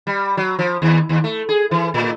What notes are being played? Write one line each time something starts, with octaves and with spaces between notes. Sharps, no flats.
G3
F#3
F3
D#2
D#2
A3
G#4
E3
A2